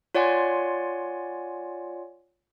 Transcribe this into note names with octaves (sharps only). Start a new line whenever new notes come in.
F4 C#5 D5 F#5 G#5 C6